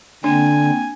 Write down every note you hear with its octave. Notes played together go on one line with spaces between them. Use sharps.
D3 A#3 C4 D4 G5 G#5